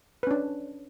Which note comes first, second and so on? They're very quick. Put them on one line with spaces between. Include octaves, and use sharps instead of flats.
B4 C#4 D4